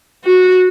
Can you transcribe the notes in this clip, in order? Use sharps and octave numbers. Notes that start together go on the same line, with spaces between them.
F#4